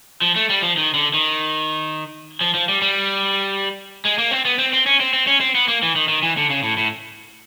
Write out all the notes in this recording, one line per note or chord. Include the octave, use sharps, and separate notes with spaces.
F3
A3
G3
F3
D#3
D3
D#3
F3
F3
G3
G3
G#3
A#3
C4
B3
C4
C4
C#4
C4
C4
C#4
C4
B3
A#3
E3
D#3
D#3
E3
D3
C#3
A2
A2